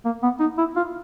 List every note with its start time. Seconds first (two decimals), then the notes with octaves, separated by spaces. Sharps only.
0.05 A#3
0.23 B3
0.40 D#4
0.58 E4
0.76 F4